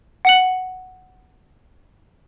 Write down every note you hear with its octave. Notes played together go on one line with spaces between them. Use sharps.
F#5 C#7 F#7